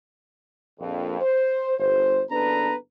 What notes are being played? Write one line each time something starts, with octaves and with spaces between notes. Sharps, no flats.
A#1 F2
C5
G1 C5
F#1 B3 D4 A4 B4 A#5